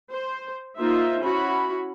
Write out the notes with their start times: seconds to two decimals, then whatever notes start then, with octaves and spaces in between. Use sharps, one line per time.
0.10 C5
0.79 A#3 D#4 F4 C5 E5
1.20 C#4 E4 F#4 B5